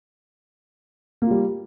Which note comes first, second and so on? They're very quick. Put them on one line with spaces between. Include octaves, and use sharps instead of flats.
A#3 F4 G3